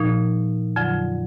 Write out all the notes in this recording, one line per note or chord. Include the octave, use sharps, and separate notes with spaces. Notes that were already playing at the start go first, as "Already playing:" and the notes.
Already playing: A#2 F3 D#4
F2 D3 F#3